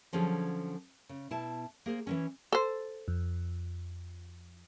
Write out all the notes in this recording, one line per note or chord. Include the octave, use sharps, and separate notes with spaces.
D3 F3 F#3 C#4 G#4 A4
C#3
B2 E4 A5
A#3 G#4 C5
E3 F#3 C#4
A4 C5
F2